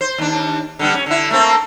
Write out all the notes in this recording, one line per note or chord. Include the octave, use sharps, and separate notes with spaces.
C5
D#2 D4
D3 G3 B3
C#4
D3 E4
A3 A#3 C4